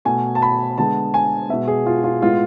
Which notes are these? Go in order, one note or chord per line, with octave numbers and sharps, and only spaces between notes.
B2 A3 G#5
A5
B5
D3 G#3 B3 A5
G#5
B2 G#3 B3 E5
G#4
F4
F4
A2 G#3 B3 F4